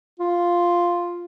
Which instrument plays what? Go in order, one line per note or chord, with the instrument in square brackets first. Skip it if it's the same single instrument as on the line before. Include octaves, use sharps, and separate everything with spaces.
[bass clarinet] F4